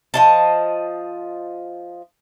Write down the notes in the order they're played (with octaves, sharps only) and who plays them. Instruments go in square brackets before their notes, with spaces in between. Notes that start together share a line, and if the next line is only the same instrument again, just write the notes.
[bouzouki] F3 D#5 A5